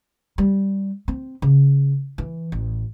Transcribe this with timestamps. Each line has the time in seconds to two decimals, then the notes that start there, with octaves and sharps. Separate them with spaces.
0.38 G3
1.08 C4
1.42 C#3
2.18 E3
2.52 A1